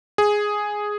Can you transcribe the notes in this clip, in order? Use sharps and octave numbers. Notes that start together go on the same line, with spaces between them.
G#4